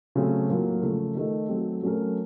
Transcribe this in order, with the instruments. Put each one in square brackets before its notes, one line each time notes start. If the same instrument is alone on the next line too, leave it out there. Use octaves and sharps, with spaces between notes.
[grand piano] C#3 F#3 A3 C4
A2 F#3 A#3 F4
C#3 F3 A3
D#3 A3 D#4
F#3 A3 C4
F#3 A3 C#4 F#4 A#4